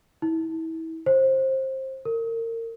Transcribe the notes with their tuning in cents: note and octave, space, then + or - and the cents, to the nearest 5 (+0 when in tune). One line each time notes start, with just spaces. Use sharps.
E4 -30
C5 +20
A#4 -30